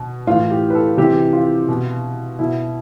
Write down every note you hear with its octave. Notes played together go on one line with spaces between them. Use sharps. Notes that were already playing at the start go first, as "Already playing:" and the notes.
Already playing: B2
A2 E3 F4
G4
B4
A4
C3 E3 G4
F4
B2
B2 E4